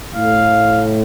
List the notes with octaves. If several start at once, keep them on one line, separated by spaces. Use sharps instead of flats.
A2 A3 F5